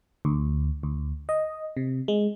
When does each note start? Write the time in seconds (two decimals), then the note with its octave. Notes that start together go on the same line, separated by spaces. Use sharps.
0.25 D2
0.83 D2
1.29 D#5
1.77 C3
2.08 G#3